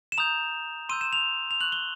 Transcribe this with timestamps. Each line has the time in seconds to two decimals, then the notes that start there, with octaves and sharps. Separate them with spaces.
0.12 E7
0.18 A#5 D#6 G6 F7
0.89 C6 E6 G6 D#7
1.01 E7
1.13 F7
1.51 F7
1.61 C#6 F#6 F#7
1.72 G7